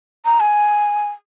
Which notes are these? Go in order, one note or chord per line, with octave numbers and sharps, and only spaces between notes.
A#5
G#5